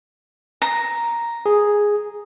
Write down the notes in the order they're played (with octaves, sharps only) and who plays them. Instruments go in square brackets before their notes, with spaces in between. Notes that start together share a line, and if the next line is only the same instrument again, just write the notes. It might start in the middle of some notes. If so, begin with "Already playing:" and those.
[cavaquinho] A#5
[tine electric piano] G#4